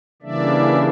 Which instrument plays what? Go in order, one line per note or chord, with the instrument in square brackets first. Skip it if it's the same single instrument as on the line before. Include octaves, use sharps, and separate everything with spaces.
[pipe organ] C#3 E3 G3 A#3 D4 D5 E5